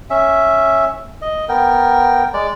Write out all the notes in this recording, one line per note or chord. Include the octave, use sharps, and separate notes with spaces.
C#4 E5
D#5
B3 A#4 G5
G#3 D5